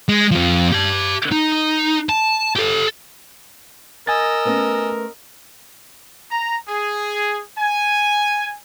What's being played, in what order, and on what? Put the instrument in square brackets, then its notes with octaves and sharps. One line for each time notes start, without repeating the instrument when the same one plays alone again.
[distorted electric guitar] G#3
F2 F3
G4 A5
D#4
A5
G4 A4
[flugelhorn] A#4 [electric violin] D#5 E6 [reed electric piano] G#5 A6
[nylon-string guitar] A3 B3 C#4
[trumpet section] A#5
G#4
G#5